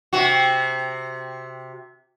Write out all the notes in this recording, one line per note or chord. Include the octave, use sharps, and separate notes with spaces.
C3 F#4